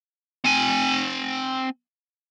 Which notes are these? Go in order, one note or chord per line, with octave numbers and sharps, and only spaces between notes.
C4 G#5